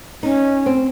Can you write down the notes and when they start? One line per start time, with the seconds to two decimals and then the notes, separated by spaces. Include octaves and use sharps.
0.23 C#4 D#4
0.66 C4